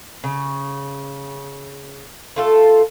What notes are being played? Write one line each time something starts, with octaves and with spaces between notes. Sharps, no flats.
C#3
A3 F4 A4